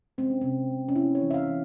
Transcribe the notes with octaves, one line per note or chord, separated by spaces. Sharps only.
G#3 C4
C#4
C3 C4
C3
C#4
A#3 E4
C#5
E3
E5
F5
E3